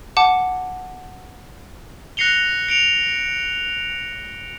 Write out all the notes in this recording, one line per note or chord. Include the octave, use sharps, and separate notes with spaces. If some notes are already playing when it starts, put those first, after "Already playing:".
F#5 A5 D6
F#6 A#6 C7 C#7 F7 G7
C#7 D7 F7